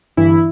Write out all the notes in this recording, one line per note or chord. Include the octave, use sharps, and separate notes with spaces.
G1 G2 E3 E4